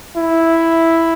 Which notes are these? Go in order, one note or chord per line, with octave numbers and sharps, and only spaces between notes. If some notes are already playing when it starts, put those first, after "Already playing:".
E4